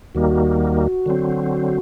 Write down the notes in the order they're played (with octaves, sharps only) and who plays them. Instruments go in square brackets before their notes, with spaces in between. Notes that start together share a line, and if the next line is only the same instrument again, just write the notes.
[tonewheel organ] D#2 D#3 G3 A#3 [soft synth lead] F#4
[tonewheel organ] D3 F#3 C4